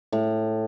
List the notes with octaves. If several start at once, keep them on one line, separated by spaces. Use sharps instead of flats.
A2